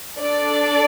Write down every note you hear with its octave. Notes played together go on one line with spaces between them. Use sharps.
D4 A4 D5